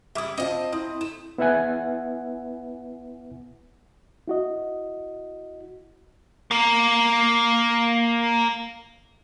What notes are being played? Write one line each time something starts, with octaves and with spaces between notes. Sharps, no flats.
G3 E4 E5 D6 D#6
C4 F4 D#5 F5 A5
C4 E4 D#6
A3 E7
B3 E4 B4 E5 F#5 G#5
E4 F#4 D#5
A#3 A#4